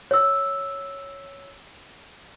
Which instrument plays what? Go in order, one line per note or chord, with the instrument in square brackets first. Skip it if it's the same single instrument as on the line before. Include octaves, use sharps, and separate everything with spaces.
[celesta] C#5 E6